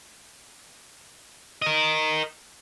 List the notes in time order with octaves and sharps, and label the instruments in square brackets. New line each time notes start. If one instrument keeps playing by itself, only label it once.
[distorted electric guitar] A#4 D#5